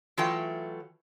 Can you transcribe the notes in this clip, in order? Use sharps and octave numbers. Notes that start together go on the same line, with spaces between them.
E3 F#3 A3 F4 G5